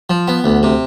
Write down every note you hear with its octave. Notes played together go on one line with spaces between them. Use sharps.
F3
B3
D2
C3